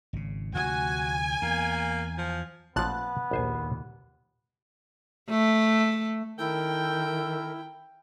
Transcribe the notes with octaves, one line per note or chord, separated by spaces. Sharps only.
G#1 C#3
D2 C3 F3 F#4 G#5
E2 A#3
F3
A1 A#2 F3 B3 A5 F#6
A#1 D#2 A#2 C5 G#5
A3
D#3 E4 A4 A#4 G5